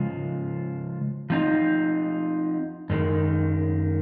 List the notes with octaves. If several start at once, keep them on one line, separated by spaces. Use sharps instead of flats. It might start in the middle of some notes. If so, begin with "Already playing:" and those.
Already playing: C#3 F3 G#3
F3 C4 D#4
F#2 D#3 G#3